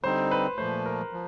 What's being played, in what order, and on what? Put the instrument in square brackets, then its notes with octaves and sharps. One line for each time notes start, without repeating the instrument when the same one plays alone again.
[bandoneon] D3 G3 C4 D#4 [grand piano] C5
[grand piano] B4
[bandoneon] A#2 F3 A3 [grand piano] C5
[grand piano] A#4
[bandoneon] F3